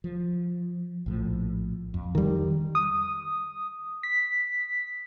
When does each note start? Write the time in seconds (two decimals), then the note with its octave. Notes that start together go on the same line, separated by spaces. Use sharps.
0.04 F3
1.06 A#1 A2 F3
1.94 F2
2.15 D#3 G3
2.75 D#6
4.03 B6